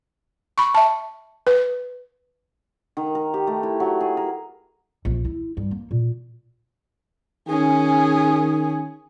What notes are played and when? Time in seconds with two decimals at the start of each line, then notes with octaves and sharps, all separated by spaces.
0.58 B5 C#6
0.75 E5 A5
1.47 B4
2.97 D#3
3.15 A#4
3.34 G4
3.47 A3
3.63 E4
3.80 F#3
4.00 G#4
4.17 A#4
5.05 A#1
5.25 E4
5.57 G2
5.71 A#3
5.91 A#2
7.48 D#3 C#4 G#4